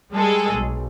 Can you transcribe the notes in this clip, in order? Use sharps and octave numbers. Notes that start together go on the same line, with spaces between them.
G3 G#3 G#4 A4
B1